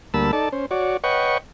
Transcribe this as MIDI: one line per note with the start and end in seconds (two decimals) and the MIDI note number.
0.14 0.31 38
0.14 0.31 55
0.14 0.31 58
0.14 0.31 81
0.14 0.31 83
0.14 0.31 88
0.33 0.49 63
0.33 0.49 69
0.33 0.49 74
0.33 0.49 81
0.52 0.66 61
0.52 0.66 72
0.71 0.97 66
0.71 0.97 73
0.71 0.97 74
1.04 1.38 71
1.04 1.38 73
1.04 1.38 75
1.04 1.38 78
1.04 1.38 79
1.04 1.38 85